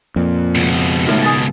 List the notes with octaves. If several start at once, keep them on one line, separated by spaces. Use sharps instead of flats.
F2 A#2
C#2 B2
A2 D#3 E4 F4
G#4 A5